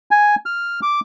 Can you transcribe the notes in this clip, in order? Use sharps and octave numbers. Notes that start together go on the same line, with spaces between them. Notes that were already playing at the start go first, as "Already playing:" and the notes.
G#5
F6
D6